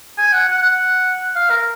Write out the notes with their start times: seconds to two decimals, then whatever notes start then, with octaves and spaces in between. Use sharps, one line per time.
0.18 G#5
0.32 F#5
0.48 F#5
0.62 F#5
1.36 F5
1.50 A#4